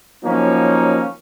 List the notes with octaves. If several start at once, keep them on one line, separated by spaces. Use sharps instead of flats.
D#3 F3 F#3 A#3 C#4 D#4